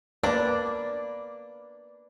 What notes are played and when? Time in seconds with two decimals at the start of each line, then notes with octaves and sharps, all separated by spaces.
0.23 A#3 D4 B4 D5